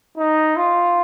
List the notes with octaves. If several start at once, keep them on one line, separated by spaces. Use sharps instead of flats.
D#4
F4